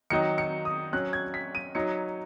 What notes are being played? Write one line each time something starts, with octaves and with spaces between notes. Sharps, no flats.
D#3 F#3 D#4 C#7
C#7
D#6
F#3 C#4 F#6
G#6
B6
D#7
F#3 D#4 C#7